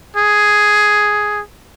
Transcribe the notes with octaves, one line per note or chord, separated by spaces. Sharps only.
G#4